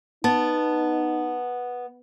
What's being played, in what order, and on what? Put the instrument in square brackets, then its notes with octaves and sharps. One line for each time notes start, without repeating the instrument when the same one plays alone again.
[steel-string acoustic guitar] B3 [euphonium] D#4 [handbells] A5 A6